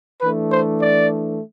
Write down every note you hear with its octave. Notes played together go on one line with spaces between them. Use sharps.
E3 A3 D4 B4
C5
D5